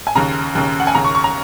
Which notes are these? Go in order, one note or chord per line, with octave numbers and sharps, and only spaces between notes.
G#5
D#2 C#3 A#5
D#2 C#3
F#5
G#5
D#2 C#3 A#5
C#6
C#6
A#5